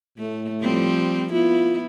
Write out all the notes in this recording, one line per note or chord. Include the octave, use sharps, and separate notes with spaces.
A2 A3
F3 G3 C4
B3 E4 F4